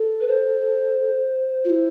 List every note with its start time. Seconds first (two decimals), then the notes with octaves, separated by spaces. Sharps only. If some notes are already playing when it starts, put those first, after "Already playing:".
Already playing: A4
0.20 B4
0.28 C5
1.65 F4
1.70 E4